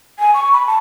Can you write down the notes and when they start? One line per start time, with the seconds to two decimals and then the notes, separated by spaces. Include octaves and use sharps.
0.19 G#5
0.34 C#6
0.52 B5
0.67 A5